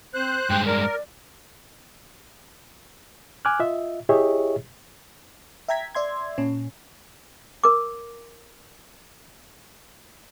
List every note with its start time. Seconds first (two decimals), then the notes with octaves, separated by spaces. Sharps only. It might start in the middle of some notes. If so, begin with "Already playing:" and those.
0.14 C4 C5 F#6
0.50 G2 G#3 G5
0.66 A#4 D5
3.45 G#5 D6 F6 F#6
3.60 F4 D#5 E5
4.09 E4 G4 G#4 C#5 D#5 E5
5.68 E5 G5 A#5 G#6 B6
5.95 D5 E5 C6 G#6
6.38 A#2 C#4
7.64 A#4 D6